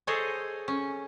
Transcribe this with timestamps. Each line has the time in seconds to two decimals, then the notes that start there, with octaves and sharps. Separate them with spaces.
0.07 G#4 A4 C5 C#5 D#5 G#5
0.68 C#4